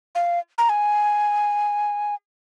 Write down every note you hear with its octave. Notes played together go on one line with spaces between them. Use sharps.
F5
A#5
G#5